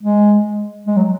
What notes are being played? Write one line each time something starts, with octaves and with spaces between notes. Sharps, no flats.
G#3
G#3
F#3